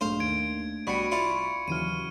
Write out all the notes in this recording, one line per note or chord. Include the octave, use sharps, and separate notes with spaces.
B1 G#2 A3 D4 C5 F5
D#2 G#6 D7
C2 B2 G3 F#4 B5 C#6 C#7
E4 F4 D5 C#7
D#2 C#3 E3 F#3 F6 C#7 D#7